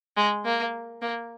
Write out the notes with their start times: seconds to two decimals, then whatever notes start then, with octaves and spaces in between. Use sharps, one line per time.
0.17 G#3
0.45 A#3
1.02 A#3